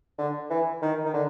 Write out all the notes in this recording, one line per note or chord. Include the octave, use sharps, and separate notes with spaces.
D3
E3
D#3
D#3
D3